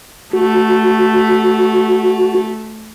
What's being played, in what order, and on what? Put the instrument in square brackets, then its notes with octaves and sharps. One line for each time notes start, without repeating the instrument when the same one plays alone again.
[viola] A3 [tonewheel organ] F#4